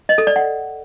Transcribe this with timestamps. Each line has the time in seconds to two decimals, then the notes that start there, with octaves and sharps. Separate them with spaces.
0.09 D#5
0.18 A4
0.27 D5
0.36 F#5